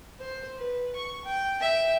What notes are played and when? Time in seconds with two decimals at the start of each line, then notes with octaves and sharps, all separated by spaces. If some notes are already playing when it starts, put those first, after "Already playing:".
0.20 C5
0.58 B4
0.96 C#6
1.25 G5
1.61 E5 G5